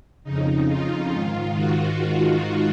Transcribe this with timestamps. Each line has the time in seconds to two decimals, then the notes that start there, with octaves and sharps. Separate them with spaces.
0.24 F2 C#3 D#4
0.68 F4
1.11 G#2 D#3
1.54 F#4